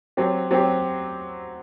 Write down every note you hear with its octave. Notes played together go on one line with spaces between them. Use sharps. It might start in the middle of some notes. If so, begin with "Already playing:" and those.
F#3 C4 G4
F#3 C4 G4